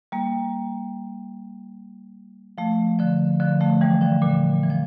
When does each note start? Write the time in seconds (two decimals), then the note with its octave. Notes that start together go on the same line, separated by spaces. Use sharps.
0.12 G3 A#3
2.58 F3 A3
2.99 D3 F3
3.40 D3 F3
3.61 F3 A3
3.81 E3 G3
4.01 D3 F3
4.22 A#2 D3
4.63 E3
4.70 F3